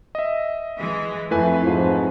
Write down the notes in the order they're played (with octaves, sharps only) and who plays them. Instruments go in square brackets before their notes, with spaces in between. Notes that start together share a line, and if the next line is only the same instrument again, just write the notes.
[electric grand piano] D#5 E5
[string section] E3 G#3
[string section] F2 [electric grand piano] A3 B4 G#5 [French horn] E4
[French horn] G#2 [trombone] F3